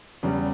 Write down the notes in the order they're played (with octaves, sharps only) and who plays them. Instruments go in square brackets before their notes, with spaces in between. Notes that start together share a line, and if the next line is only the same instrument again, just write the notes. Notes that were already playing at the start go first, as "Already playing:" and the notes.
[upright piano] E2 C#3 G3